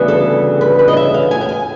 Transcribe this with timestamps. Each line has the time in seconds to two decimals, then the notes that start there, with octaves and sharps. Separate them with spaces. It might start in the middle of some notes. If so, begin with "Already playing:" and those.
Already playing: D2 C#3 E3 G3 B3
0.08 A4
0.61 B4
0.79 B4
0.88 D#5
0.97 E5
1.14 F5
1.31 G#5
1.41 G5
1.49 G#5